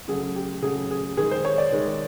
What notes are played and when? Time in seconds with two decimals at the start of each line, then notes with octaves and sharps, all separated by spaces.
0.08 C#3 F#3 A3 G#4
0.36 G4
0.62 C#3 F#3 A3 G#4
0.91 G#4
1.17 D#3 G#3 G#4
1.31 C5
1.45 C#5
1.58 D5
1.72 D#3 G#3